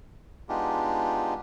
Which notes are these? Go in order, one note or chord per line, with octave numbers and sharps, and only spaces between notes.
G#3 B3 D4 D#4 F4 G4